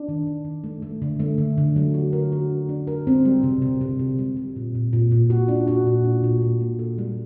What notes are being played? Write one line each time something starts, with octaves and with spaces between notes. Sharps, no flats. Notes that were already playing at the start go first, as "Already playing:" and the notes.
Already playing: D4
D#3
D#3
D#3
A3
A3
D3
A3
D3
D3
F#3
F#4
A#4
F#4
D4
D4
A#4
C4
G3
C3
C3
C3
C3
G3
G3
A#2
A#2
A#2
A#2
F#4
D4
F#4
A#2
D4
A#2
A#3
A#3
A4
G3